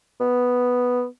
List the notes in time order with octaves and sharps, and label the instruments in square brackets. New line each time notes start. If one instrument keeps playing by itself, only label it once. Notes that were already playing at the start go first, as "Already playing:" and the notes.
[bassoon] B3